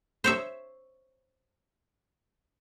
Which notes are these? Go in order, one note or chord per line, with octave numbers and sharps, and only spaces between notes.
C5 C#5 E5